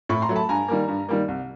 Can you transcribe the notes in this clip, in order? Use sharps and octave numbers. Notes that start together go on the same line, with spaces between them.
A2 B5 C#6
A#5 C6
F#3 A3
A5 B5
G2 G#5 A#5
D#3 G3 A#3
G2
D#3 G3 A#3
C2